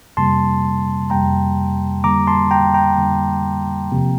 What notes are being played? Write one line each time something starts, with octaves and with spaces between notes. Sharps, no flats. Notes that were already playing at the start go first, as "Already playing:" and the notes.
F2 C3 G3 A#3 A5 C6
F2 C3 G3 A#3 G5 A#5
F2 D3 G3 A#3 A#5 D6
A5 C6
G5 A#5
G5 A#5
F2 D3 G3 A#3
E2 C3 F3 A#3